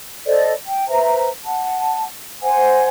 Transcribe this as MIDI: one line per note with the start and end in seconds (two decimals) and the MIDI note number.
0.25 0.53 69
0.25 0.53 72
0.25 0.53 74
0.25 0.53 75
0.66 0.88 79
0.88 1.28 71
0.88 1.28 72
0.88 1.28 76
0.88 1.28 82
1.45 2.04 78
1.45 2.04 81
2.42 2.88 72
2.42 2.88 78
2.42 2.88 80